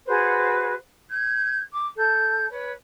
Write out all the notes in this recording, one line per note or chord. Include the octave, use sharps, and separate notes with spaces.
F#4 G#4 B4 C5
G6 G#6
D6
A4 G6
B4 C#5